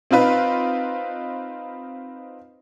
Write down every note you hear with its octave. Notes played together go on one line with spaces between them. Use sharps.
C4 D#4 F4 B4